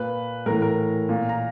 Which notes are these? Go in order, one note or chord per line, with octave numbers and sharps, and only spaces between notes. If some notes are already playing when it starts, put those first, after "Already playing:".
Already playing: A#2 B4 B5
A2 E3 A#4 A#5
A#4 A#5
A#2
A#5